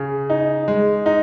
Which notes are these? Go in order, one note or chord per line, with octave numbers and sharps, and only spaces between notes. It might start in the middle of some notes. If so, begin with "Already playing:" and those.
Already playing: C#3
D#4
G#3
D#4